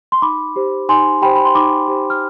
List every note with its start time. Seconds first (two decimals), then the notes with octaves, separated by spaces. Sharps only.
0.12 C6
0.22 D#4 B5 D6
0.56 G4 C5
0.89 D#4 G#5 C6
1.22 G4 C5 G5 B5
1.36 B5
1.45 C6
1.55 D#4 B5 D6
1.88 G4 C5
2.10 F6